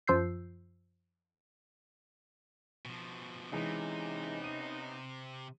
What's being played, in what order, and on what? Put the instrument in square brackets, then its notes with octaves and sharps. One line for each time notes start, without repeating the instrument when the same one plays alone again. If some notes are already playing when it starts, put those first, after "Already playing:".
[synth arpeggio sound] F#2 F3 F4 E6 G6 C7
[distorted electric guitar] B2 F3
[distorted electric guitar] C3 [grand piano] E3 G#3 [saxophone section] B3 C#4 D#4
[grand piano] D#7